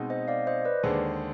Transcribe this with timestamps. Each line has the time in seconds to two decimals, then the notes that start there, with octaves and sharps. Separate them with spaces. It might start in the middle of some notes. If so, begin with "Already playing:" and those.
Already playing: B2 G#3 C4 D#4
0.10 C5 D#5
0.28 D5 F5
0.47 C5 D#5
0.65 B4 D5
0.83 D#2 D3 G#3 G#4 C5